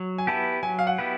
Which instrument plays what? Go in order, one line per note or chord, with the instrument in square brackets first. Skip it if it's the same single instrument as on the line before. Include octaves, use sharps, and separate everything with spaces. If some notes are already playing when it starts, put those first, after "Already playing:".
Already playing: [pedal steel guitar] F#3
[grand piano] G#5
[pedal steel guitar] B3 E4 G4 B4 [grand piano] A5
[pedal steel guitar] F#3 [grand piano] G#5
[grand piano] F5
F#5
[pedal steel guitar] B3 E4 G4 B4